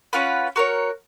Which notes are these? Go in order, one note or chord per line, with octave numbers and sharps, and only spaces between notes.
C#4 F4 B4 F#5
F#4 A#4 C#5